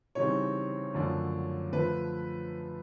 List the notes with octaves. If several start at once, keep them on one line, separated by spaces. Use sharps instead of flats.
C#3 E3 G3 C4 D#4 C#5
F#2 D3 F3 A3 D4
D3 F3 A3 B4